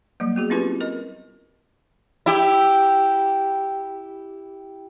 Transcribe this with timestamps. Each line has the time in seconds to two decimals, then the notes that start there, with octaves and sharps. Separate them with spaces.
0.20 F#3 G3 A#3
0.36 B3 F#4 G#4
0.50 C4 C#4 E4 F4 G4 B4
0.81 A#4 D#5
2.26 E4 G4